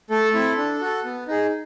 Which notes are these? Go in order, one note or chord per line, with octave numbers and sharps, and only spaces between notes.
A3 A4
C4 E4
D4
F#4 A4
B3
D#4 G#4